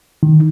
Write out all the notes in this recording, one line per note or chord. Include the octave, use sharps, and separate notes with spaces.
D#3